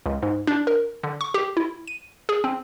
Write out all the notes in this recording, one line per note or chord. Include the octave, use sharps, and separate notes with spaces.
C#2
G#2
D4
A#4
D3
C#6
G4
E4
D#7
G#4
C4